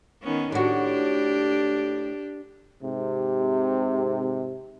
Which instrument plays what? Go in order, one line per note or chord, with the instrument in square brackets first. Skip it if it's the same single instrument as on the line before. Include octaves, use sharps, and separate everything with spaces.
[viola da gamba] D#3 B3 C#4
[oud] A2 F#4 [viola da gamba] D4 G4
[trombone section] G#2 C3